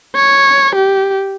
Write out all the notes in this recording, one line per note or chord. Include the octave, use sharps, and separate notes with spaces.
C#5
G4